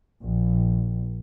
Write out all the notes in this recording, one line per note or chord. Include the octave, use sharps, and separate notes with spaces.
A#1